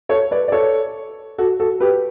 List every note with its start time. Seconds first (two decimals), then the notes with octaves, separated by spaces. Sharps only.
0.09 A4 C#5
0.31 B4 D5
0.48 D5
0.52 A4 C#5
1.38 F#4 A4
1.60 F#4 A4
1.80 G4 B4